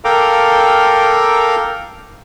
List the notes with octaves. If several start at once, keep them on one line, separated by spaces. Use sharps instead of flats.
A4 A#4 F5 G5 A#5 D6